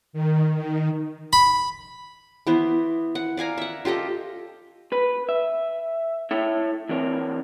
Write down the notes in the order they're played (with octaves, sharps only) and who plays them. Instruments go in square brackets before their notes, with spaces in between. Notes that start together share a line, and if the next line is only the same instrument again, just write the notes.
[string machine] D#3
D#3
[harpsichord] B5
[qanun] E3 B3 C5
F#5
D5 F5 G#5 A#5
E5 F#5
F4 G4 A4 D#5
[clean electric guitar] B4
E5
E4 A4 C#5 E5
E3 C4 A#4 C#5